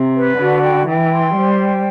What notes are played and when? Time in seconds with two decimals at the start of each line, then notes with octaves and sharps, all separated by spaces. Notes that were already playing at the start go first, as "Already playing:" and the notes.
Already playing: C3
0.16 B4
0.39 D3 F#4
0.64 G5
0.88 E3 G5
1.12 C6
1.36 G3 C5
1.60 G5